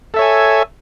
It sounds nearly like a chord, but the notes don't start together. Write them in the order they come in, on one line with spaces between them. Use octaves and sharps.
A4 E5 C#5 G#5